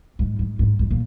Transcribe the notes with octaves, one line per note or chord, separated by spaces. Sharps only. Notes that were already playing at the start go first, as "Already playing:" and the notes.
G#2
G#2
G#2
G#2
A#2